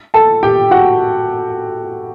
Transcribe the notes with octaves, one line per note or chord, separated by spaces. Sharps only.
A4 A5
G4 G5
F#4 F#5